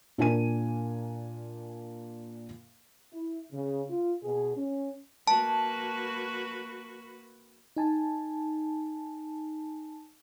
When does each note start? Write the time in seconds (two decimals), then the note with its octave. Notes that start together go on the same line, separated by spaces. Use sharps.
0.18 A#2 D4 A#4 G#5 D#7
3.13 E4
3.52 C#3
3.90 F4
4.23 B2 G#4
4.56 C#4
5.27 A#3 F#4 B4 A5
7.76 D#4 G#5 A5